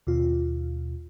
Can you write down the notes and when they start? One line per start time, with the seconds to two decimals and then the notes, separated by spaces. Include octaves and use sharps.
0.07 D#2 B2 F4